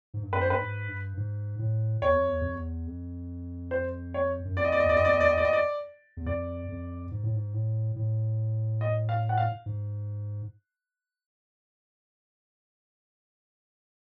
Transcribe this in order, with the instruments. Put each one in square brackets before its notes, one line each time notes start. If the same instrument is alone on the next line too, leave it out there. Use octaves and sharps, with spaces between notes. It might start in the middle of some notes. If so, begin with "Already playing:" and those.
[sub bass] G#2
G2
[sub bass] F#2 [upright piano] B4
[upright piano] C5
[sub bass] G2 [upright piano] B4
[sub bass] G#2
G2
G#2
A2
[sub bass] E2 [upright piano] C#5
[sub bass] F2
E2
F2
E2
F2
[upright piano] C5
C#5
[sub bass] F#2
[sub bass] F2 [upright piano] D5
[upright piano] D#5
D5
D#5
[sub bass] E2 [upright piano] D5
[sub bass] F#2 [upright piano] D#5
[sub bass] F2 [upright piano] D5
[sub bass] E2 [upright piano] D#5
[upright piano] D5
D#5
D5
D#5
D5
[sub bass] E2
[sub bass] F2 [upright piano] D5
[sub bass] F2
G#2
A2
G#2
A2
A2
[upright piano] D#5
F5
F#5
F5
[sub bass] G#2